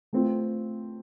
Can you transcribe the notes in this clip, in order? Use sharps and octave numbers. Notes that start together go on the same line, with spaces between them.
A3 C4 F4